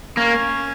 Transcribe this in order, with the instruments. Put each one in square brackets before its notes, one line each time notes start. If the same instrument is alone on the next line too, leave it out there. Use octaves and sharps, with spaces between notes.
[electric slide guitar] A#3 [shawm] C#4